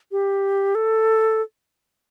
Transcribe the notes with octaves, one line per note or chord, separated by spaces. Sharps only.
G4
A4